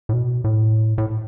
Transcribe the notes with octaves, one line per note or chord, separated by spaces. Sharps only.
A2
B2
A2
A2